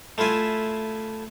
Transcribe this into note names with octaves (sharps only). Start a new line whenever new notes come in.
A3 E4 F4 E5 G#5